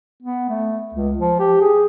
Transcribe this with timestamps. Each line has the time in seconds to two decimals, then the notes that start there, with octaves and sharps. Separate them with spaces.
0.23 B3
0.49 A3
0.94 C#2
1.19 F3
1.39 G4
1.61 G#4